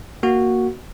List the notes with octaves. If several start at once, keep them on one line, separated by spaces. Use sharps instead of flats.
A#3 F#4